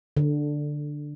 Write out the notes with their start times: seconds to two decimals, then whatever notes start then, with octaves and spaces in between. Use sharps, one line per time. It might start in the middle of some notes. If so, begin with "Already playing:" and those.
0.17 D3